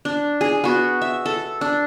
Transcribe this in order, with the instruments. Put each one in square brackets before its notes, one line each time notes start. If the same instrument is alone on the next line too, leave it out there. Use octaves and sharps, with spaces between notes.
[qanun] D4
G#4
B3 F#4
E5
A4
D4